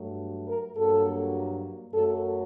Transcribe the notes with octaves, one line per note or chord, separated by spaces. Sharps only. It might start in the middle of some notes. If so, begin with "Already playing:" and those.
Already playing: G2 F#3 A3
A#4
G2 F#3 A#3 A4
F#2 F#3 A3 A4